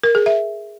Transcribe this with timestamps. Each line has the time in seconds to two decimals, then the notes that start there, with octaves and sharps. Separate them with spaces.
0.04 A#4
0.15 G#4
0.26 E5